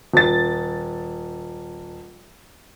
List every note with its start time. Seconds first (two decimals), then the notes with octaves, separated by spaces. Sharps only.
0.14 D#1 A6